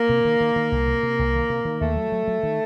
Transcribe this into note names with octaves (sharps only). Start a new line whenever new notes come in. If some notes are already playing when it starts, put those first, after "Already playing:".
Already playing: A#3
C3
D#3
D#3
D#3
C2
C3
C3
C2
D#3
C3
D#3
D#2 A3
F#3
F#3
F#3
D#3